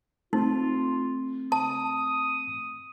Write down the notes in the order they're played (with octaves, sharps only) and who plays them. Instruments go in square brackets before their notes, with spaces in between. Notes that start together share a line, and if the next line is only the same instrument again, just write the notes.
[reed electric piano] A3 C4 [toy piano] D#4 [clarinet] F4
[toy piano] A5 [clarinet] D#6